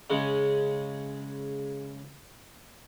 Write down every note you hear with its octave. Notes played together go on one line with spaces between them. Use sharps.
C#3 G#3